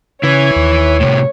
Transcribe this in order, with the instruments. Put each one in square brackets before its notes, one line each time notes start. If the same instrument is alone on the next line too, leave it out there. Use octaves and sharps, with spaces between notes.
[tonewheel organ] C#3 G#6 [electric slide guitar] E4 B4 [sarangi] C#5
[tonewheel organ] D#2
[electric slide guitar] A2 C3